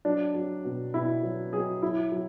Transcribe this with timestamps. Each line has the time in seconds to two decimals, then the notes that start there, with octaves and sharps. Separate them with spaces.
0.05 F#3 D4
0.34 F#3
0.65 B2
0.94 B2 E4
1.23 F#3
1.53 F#3 G#4
1.82 F#3 E4
2.12 F#3